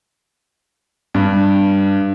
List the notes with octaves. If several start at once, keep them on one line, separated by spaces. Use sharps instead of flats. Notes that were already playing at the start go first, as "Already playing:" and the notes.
G2